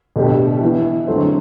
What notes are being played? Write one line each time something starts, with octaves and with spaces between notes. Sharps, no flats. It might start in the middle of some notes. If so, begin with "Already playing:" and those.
B2 A3 D4 G4
E3 B3 E4
D3 F#3 A3 C4